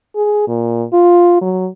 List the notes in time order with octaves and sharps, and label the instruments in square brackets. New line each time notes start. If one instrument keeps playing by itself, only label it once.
[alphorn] G#4
A#2
F4
F#3